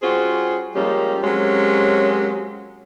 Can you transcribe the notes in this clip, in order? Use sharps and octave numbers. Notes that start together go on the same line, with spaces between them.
G3 C#4 F4 F#4 G#4 C5
F3 G3 G#3 A#3 C#4 G4
F#3 G#3 A#3 C4 C#4 G4